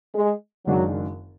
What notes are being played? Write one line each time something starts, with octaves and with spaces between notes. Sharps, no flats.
G#3
F#1 F#2 D#3 F#3 G#3 D4